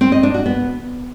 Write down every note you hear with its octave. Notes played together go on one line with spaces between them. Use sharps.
C4
D#5
D4
F#4
B3